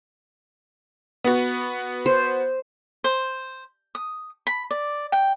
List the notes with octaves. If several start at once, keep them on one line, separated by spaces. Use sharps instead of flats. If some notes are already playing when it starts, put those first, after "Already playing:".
B3 F#4
C5
C5
D#6
B5
D5
G5